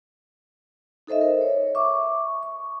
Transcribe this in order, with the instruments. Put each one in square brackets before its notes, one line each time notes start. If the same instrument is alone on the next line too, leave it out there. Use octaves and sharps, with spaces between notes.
[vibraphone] D#4 A4 C5 D#5 E5
A#4
C#5
E5 C#6 D6
C#6